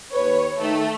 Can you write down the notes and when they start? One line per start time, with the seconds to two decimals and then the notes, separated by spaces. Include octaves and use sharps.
0.14 D#2 B4 C#5
0.60 D#3 A3